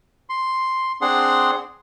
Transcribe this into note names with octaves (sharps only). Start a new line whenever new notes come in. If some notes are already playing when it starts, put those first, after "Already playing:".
C6
C4 D4 G#4 F#5 C6